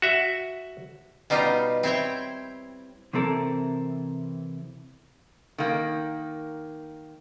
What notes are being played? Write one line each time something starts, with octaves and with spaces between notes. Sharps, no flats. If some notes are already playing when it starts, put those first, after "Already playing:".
F#4 E5
B2 G3 D#4 F4
C4 E4 C#5 G5
C3 E3 C4 A4 A#4
D#3 A#3